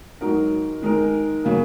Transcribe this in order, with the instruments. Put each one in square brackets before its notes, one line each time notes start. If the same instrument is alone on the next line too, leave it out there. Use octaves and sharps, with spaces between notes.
[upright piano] G#2 F#3 D#4 F#4 A#4
D#3 G#3 D#4 A#4
C#3 F#3 A#3